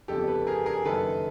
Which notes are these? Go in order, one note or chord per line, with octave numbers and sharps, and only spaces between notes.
G1 F2 C#3 G4 A4
A4 B4
G#4 A#4
G#4 A#4
F#1 F#2 D#3 A4 B4